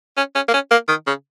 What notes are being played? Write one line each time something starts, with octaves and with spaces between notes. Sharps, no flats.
C#4
C#4
A#3
C#4
A#3
D#3
C#3